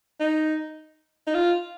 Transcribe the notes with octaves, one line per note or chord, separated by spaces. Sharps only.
D#4
D#4
F4